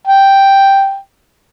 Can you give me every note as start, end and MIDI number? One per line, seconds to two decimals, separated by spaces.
0.08 0.98 79